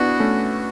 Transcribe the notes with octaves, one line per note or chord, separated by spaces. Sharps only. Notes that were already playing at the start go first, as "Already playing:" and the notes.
Already playing: B3 D4 E4 F#4
A3 C#4